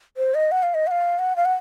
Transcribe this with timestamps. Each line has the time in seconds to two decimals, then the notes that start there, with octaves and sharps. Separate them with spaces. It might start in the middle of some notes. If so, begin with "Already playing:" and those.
0.17 C5
0.35 D#5
0.52 F#5
0.63 F5
0.74 D#5
0.87 F#5
0.91 F5
1.19 F#5
1.36 F5
1.45 F#5